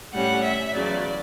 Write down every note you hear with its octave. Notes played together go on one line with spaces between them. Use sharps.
A2 G3 C#4 F#5
E5
E2 C#3 F#3 D5